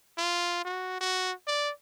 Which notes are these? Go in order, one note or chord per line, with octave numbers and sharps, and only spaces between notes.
F4
F#4
F#4
D5